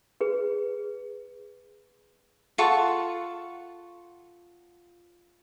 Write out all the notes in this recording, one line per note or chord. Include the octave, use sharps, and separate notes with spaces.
G#4 B4
F4 A4 F#5 C#6